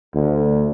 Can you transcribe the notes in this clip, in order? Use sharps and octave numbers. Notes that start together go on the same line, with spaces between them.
D2